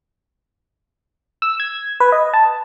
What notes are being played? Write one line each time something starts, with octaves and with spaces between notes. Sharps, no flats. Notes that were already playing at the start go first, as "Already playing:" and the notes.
E6
G#6
B4
D#5
A5